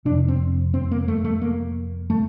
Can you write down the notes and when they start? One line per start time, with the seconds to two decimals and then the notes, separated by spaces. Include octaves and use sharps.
0.05 C3 D4
0.09 F2
0.28 C4
0.74 C4
0.91 A#3
1.08 A3
1.25 A3
1.42 A#3
2.10 A3